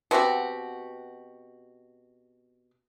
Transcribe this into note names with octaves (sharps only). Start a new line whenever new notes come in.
B2 C4 F#4 G4